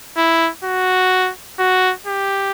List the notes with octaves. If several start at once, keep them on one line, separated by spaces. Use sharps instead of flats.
E4
F#4
F#4
G4